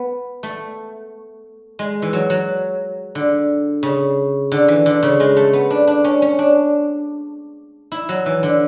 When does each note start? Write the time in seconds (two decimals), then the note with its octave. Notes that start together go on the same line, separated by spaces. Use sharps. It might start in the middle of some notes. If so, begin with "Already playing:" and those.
Already playing: B3
0.43 A3
1.79 G#3
2.02 E3
2.13 F#3
2.30 F#3
3.15 D3
3.83 C#3
4.52 D3
4.68 E3
4.86 D3
5.03 C#3
5.20 G#3
5.37 A3
5.53 B3
5.70 D4
5.88 D4
6.04 C#4
6.22 C#4
6.39 D4
7.92 E4
8.09 F#3
8.26 E3
8.43 D3